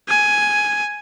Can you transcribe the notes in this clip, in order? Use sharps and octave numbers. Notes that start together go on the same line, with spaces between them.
G#5